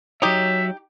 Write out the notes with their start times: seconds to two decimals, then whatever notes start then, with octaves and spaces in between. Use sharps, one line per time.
0.22 F#3 D#4 G4 C#5 E5